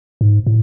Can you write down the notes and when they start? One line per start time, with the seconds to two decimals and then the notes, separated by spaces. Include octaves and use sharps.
0.21 G#2
0.47 A2